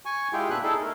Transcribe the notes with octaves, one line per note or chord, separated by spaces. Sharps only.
G#5 C#6
G#3 E4 F4 G4 G#4 G5
A#2 B3 D4 B4 E5 F#6
D#4 E4 G#4 A4
A3 A#4